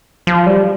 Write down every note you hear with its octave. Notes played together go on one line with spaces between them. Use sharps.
F3
G3